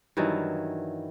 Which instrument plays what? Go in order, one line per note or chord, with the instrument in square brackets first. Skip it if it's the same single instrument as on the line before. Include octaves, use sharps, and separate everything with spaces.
[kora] G2 D#3 E3 F#3